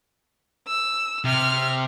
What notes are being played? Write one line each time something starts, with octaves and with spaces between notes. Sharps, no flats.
E6
C3 F6